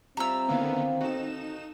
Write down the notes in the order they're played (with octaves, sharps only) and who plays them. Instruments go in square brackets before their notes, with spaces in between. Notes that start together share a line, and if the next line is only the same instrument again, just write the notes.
[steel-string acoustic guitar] G3 F4 E5 [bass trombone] C4 [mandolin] A#5 E6
[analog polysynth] D3 D#3 B3 [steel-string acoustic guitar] A#3 E4 F5
[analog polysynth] D#4 E7 [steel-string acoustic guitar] F#4 A4